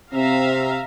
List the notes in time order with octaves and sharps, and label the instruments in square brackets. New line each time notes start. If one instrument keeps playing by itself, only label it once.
[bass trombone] C3 [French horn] C4 [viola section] E5 F5 A#5